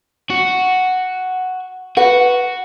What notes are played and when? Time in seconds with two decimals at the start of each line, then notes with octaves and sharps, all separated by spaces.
0.30 F#4
1.97 F#4 B4 F#5